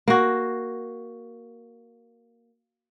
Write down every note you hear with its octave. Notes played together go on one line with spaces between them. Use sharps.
A#3 F#4